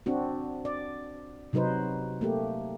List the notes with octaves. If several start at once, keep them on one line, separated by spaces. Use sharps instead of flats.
C4 D4 F#4
D5
C3 F#3 D#4 B4 C5
A3 A#3 G4